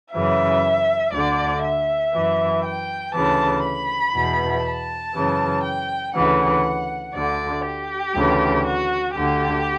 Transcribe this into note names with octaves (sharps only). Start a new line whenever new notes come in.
F#2 C#3 E3 E5
D2 D3 D5
E5
F#2 E3
G5
D2 C#3 E3 A5
B5
E2 B2
A5
F#2 C#3 E3
G5
D2 C#3 E3 F#5
D2 D3 D5
G4
D2 C#3 E3
F#4
D2 D3 G4